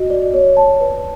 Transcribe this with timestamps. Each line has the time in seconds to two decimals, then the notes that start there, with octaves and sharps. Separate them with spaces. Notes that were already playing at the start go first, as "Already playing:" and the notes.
Already playing: F#4 D#5
0.10 D5
0.34 C#5
0.57 A5
0.80 B4